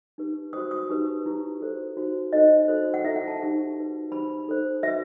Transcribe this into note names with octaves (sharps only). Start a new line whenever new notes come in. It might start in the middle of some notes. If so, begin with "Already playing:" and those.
D#4 G4 B4
F#4 C5 D#6
D#6
D#4 G4 B4
E4 G4 B4
F#4 A4 C5
D#4 F#4 C5
D#4 A4 C5 D#5
F#4 A4 C5
F#5
E4 A4 C5 E5
F#5
A5
D#4 G4 C5
F#4 B4
D#4 G4 C5 B5
D#4 A4 C5
F#4 B4 E5